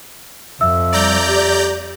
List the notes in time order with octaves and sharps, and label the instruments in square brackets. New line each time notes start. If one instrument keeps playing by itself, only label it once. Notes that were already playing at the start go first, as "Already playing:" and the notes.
[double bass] F2 [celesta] E5 E6
[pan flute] G3 [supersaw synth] D5 A#5 G6
[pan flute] G4